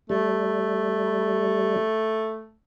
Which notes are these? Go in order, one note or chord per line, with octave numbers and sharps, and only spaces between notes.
G3 A3